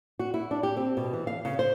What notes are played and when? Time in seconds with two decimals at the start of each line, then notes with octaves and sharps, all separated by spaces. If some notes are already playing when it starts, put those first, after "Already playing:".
0.19 F#4
0.34 E4
0.51 D4
0.63 G4
0.77 C4
0.97 B2
1.13 E3
1.27 F5
1.45 C#3
1.59 C5